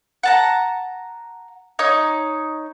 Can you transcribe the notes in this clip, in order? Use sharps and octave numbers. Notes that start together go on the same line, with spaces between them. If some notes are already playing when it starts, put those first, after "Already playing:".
F#5 A5 A#5
D#4 C#5